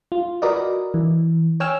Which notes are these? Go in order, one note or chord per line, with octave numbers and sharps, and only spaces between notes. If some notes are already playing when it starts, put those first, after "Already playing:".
F4
F#4 A#4 B4 D5 D#5
E3
C#5 G5 G#5 E6 F6